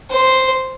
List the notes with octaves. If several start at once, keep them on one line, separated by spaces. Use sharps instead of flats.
C5